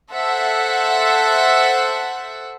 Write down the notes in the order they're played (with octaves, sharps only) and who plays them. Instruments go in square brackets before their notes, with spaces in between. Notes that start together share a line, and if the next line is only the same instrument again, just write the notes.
[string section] A4 C5 E5 F#5